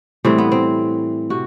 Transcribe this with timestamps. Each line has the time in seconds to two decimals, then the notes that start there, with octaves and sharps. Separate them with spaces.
0.25 A2 E3 G3 C4
0.38 B3
0.52 C4
1.30 C3 F#4